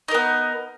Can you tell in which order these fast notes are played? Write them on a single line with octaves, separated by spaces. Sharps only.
D#4 A#4 B3